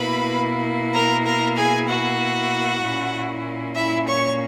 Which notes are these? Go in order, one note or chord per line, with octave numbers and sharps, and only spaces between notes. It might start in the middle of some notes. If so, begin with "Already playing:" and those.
Already playing: B2 A#3 E4 B4 B5
A#4 A#5
A#4 A#5
G#4 G#5
F#4 F#5
A#2 A#3 C#4 E4
E4 E5
C#5 C#6